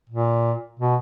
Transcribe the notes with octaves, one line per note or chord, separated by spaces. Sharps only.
A#2
B2